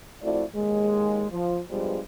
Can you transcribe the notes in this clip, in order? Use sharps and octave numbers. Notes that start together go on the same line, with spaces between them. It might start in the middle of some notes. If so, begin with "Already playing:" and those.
F3 A3 C4 E4 F#4 D5
D#2 G#3
F3
G2 B2 F3 G3 G#3